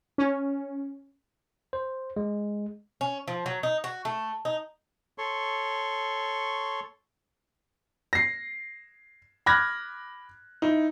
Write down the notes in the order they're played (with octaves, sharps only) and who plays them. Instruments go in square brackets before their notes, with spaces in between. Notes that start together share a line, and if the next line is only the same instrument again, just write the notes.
[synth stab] C#4
[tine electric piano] C5
G#3
[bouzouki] C#4
F3
F#3
D#4
F#4
A3
D#4
[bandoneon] A4 C#5 C6 C#6
[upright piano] A#6 C7
B5 D6 F6 F#6 G#6 A#6
D#4 E4